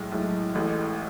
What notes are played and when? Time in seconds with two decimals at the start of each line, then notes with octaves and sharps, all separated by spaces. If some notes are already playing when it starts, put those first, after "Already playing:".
Already playing: B1 A2 G#3
0.12 B1 A2 G#3
0.55 A1 A2 G#3